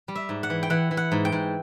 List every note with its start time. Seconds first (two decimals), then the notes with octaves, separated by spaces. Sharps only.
0.08 G3
0.15 E5
0.29 G#2
0.43 F#5
0.50 E3
0.63 G5
0.70 E3 F#5
0.91 E3
0.97 F#5
1.12 G#2
1.25 G5
1.32 G#2